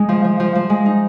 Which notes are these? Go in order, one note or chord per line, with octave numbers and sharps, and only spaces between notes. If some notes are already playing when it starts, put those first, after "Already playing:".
Already playing: G#3 D#4
F3
F3
F3
F3
G#3
D#4